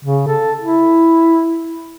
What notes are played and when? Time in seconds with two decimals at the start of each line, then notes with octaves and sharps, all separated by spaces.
0.05 C#3
0.27 A4
0.59 E4